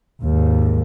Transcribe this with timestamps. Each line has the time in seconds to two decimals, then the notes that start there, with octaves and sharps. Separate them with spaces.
0.22 D#2 G#2